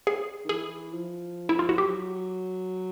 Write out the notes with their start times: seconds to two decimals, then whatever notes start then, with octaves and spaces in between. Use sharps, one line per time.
0.07 G#4
0.45 D#3
0.49 E3 G#4
0.93 F3
1.49 E4
1.59 F4
1.69 F#4
1.78 F#3 G4